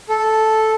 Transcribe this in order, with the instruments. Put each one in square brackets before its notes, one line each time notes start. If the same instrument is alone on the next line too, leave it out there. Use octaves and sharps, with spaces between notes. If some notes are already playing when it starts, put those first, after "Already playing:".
[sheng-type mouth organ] A4